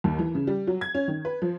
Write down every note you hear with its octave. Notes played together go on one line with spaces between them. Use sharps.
D#2
E3
C#3
G3
F#3
G#6
C#4
D#3
B4
F3